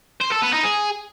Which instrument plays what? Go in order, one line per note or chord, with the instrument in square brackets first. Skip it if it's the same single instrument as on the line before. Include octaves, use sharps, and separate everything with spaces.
[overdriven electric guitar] C5
A4
B3
D#4
G#4